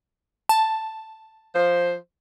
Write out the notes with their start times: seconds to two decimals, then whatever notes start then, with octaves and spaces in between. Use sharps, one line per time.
0.49 A5
1.55 F3 C5